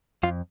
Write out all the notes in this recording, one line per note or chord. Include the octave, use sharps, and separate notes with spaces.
F2 F4